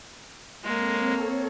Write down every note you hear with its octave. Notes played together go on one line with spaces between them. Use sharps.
G#3 A#3 C4 A4 C#5